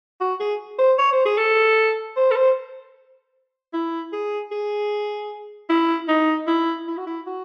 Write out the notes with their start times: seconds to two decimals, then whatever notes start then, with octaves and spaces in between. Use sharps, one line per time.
0.21 F#4
0.40 G#4
0.79 C5
0.98 C#5
1.12 C5
1.26 G#4
1.38 A4
2.17 C5
2.31 A4
2.36 C5
3.73 E4
4.13 G#4
4.51 G#4
5.69 E4
6.08 D#4
6.47 E4
6.87 E4
6.97 F#4
7.07 E4
7.26 F#4